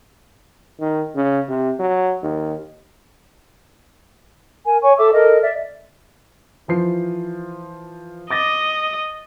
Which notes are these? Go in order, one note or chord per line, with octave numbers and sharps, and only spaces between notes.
D#3
C#3
C3
F#3
D#2
A#4 G#5
C#5 G#5 C#6
A4 E5 D6 E6
A4 A#4 D#5
D5 E5
E3 F3 C7
D#5 D6 A6 A#6